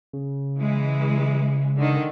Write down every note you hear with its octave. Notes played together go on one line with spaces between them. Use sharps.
C#3
E3 G#3
D3 D#3